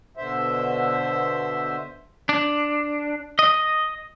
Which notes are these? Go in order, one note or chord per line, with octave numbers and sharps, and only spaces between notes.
B2 D3 C5 E5
D4
D#5